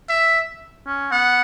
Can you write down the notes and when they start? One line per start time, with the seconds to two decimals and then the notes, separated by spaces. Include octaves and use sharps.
0.09 E5
0.87 C#4
1.12 B3 F#5